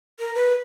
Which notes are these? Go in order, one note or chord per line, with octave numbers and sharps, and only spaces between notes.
A#4
B4